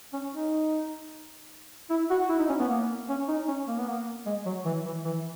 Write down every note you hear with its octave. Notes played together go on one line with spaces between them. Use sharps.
C#4
D#4
E4
F#4
E4
D#4
C#4
B3
A#3
C#4
D#4
C#4
A#3
B3
A#3
G#3
F#3
E3
E3
E3